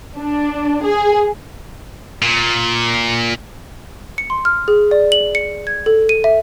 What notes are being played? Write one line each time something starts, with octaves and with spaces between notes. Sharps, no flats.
D4
G#4
A#2
C#7
C6
F6
G#4
D5
F#7
C#7
G#6
A4
D#7
E5